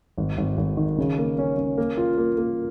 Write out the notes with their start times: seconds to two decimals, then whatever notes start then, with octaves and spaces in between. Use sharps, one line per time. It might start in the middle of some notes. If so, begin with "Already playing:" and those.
0.18 G#1
0.38 G#1
0.58 G#1
0.77 D#3
0.98 C#3
1.18 A#3
1.38 C#4
1.57 C#4
1.78 A#3
1.98 F4
2.17 A#3
2.38 A#3